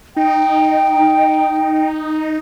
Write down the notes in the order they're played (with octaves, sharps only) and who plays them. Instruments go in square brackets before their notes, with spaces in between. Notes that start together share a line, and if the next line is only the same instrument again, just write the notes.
[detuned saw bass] D#4 [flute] G5